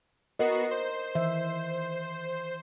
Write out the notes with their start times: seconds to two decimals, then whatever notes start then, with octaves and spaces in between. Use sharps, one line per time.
0.39 B3 F#4 A#4 D#5 C7
0.71 C5
1.15 D#3 E3 E5